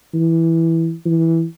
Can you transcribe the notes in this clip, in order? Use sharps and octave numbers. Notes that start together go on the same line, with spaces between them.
E3
E3